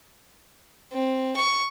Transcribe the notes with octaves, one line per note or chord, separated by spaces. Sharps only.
C4
C#6